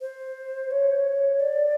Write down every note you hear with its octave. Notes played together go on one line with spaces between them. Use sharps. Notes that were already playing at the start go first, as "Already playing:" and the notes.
C5
C#5
D5